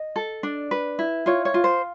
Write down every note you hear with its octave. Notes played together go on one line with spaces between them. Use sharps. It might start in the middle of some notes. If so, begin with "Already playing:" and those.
Already playing: D#5
A4
D4
B4
E4
F4 C#5
C#5
F4
C5